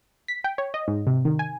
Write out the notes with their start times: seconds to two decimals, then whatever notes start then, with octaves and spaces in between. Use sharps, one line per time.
0.28 B6
0.44 G5
0.58 C#5
0.74 D#5
0.88 G#2
1.07 C3
1.25 D#3
1.39 G#5